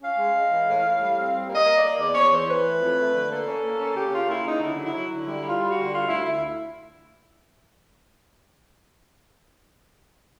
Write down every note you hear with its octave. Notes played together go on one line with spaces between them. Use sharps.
C#4 F5
G#3
G#3
E3
A2
A2
G3
C4
G3
A#3
D#5
A#3
D5
A#3
E2 D5
E2 C#5
E3 C5
E3 B4
A3
F2
A3
D3
A#3 A4
C#4
A#3
C#4
C#3 G4
C#3 F4
A#3 E4
C#3 D#4
D3 E4
F#3
E4
F#3
D3
G3 E4
G3
F4
G3
D3 F#4
G3 F4
D2 E4
D2 E4